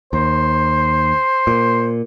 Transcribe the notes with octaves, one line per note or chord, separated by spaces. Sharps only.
D#2 C5
A#2